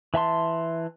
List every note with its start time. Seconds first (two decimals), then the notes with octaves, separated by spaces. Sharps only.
0.14 E3 E5 A5 C6